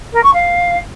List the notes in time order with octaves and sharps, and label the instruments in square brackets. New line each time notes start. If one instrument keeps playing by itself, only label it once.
[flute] A#4
C#6
F5